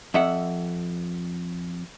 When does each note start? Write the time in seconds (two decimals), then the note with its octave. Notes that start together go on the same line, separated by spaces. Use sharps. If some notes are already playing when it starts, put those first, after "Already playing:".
0.14 F2 E5 F#5